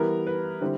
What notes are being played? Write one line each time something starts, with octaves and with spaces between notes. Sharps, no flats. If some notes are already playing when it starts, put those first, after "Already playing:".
Already playing: E3 G3 B3 A#4
B4
D3 G3 C4 E4